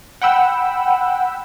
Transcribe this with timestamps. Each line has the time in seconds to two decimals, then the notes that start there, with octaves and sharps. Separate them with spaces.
0.22 F#5 G5 B5 E6